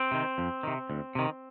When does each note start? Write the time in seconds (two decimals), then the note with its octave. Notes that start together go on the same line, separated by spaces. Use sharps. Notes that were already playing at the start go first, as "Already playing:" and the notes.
Already playing: C4
0.12 C3 D#3
0.38 F2
0.63 C3 D#3
0.90 D2
1.15 C3 D#3